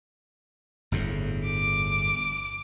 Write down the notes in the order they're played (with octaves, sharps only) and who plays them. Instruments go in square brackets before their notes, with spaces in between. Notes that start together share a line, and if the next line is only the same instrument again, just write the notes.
[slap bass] G1 E2 A2
[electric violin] D6